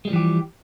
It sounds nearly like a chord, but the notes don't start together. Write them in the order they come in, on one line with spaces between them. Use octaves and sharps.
G#3 G3 F3 E3 G4